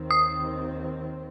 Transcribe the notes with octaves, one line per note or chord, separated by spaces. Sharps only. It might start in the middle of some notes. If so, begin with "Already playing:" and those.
Already playing: D#2 D#3 C4
D#6